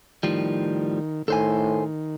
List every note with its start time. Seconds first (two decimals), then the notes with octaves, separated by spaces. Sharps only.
0.23 A2 D#3 F3 G3
1.28 A2 D#3 A4 C5 G#5